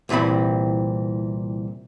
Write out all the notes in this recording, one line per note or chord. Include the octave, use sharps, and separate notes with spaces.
C2 A#2 E3 C4 B5